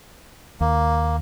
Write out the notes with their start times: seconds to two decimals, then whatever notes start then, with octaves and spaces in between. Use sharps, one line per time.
0.61 D#2 A#3